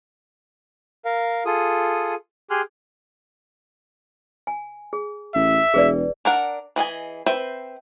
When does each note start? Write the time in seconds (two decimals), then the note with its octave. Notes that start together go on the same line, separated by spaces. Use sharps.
1.05 A#4 F5
1.46 F4 G#4 A4 D#6
2.50 G4 G#4 G#5 C6 F6 F#6
4.47 G#5
4.93 G#4
5.35 A1 E5
5.74 E1 G#4 B4 D5
6.25 D4 A#4 F#5
6.76 E3 G#4 D#5 G#5
7.26 C4 B4 E5 G5